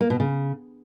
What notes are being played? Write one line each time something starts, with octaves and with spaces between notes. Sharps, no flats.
A#3
B2
C#3